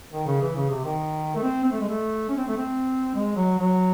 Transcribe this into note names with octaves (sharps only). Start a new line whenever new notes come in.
D#3
C#3
E3
C#3
C3
D#3
A3
C4
C4
A3
G#3
A3
C#4
C4
A3
C4
G#3
F#3
F#3